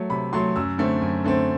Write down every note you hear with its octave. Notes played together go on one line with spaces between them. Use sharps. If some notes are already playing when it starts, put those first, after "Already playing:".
Already playing: F#3 A3
C3 B5
F#3 A3 C6
F#2 E6
D3 A3 C4
F#2
D3 A3 C4